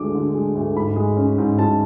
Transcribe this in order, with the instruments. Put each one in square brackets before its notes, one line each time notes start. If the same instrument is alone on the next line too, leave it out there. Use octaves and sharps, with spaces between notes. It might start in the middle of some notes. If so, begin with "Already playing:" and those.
Already playing: [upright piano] D2 D3 G#3 D4 D6
D3
G#3
D2
G#2 B5
G#3
C#4
G#2
G#2 A5